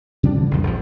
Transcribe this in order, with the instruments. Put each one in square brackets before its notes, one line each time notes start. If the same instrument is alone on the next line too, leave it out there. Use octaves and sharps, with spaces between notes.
[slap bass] C#3 F3 G3 D4
D3 E3
A#1 F2 G3
G1 C#3 F3